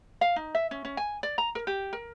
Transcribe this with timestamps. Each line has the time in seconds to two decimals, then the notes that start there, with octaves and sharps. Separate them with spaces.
0.21 F5
0.36 D#4
0.55 E5
0.71 C#4
0.85 C#4
0.97 G#5
1.23 D5
1.38 A#5
1.55 A#4
1.67 G4
1.93 A#4